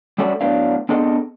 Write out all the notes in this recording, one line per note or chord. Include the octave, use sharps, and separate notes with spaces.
G3 A3 C#4 F#4 A4 D5
A2 F#3 B3 D4 D5 F5
B3 C4 D4 G#4 A4 D#5